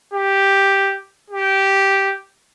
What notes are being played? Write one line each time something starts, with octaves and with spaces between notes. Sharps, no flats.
G4
G4